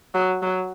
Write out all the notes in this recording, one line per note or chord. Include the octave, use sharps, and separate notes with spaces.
F#3
F#3